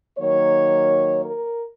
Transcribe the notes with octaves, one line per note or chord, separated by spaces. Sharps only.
D#3 F#3 A#3 C#5
A#4